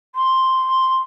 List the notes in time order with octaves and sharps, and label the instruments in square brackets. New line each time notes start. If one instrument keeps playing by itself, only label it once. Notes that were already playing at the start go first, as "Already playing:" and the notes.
[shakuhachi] C6